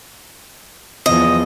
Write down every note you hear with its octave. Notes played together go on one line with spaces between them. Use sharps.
E2 F3 D#5